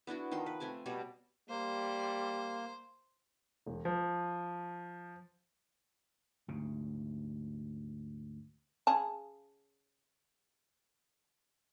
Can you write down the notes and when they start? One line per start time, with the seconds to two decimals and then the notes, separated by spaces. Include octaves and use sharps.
0.07 B3 D4 E4 F#4
0.31 D#3 F3 G5 C6
0.46 B4
0.60 A3 C4 G#5 D6
0.86 B2 G3 C#5 D5
1.49 G3 A#3 C5
3.66 E1
3.85 F3
6.48 D2 G#2 C#3
8.87 C#3 G#4 A5